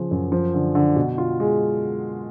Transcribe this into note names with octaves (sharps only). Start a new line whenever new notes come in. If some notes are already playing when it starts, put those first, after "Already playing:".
Already playing: C#3 F3
F#2
F3
D3
D3
B2
F4
G#3